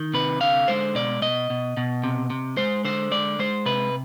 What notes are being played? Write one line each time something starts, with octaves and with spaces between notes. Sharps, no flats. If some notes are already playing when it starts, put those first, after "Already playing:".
Already playing: D#3
C3 B4
D3 F5
G#3 C5
B2 D5
B2 D#5
B2
B2
C3
C3
G#3 C5
D3 C5
G#3 D5
G#3 C5
C3 B4